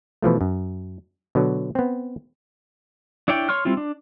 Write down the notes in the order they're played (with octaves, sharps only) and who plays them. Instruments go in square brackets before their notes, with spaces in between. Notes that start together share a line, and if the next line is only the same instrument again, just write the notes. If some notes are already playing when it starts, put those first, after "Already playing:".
[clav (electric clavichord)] B2 E3 F3 A3
F#2
B2 D3 F#3
B3 C4
[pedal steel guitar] D4 E4 C#5 D5 G5
C#5 C6 C#6 F6
G3 C4 E4 F4
D4